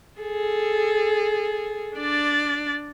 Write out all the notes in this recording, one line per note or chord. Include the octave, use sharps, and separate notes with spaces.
G#4 A4
D4 D5